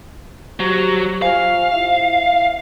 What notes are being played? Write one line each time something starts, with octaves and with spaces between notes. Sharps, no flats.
F#3 G4 C5
F4 C5 F5 G#5
E4 E5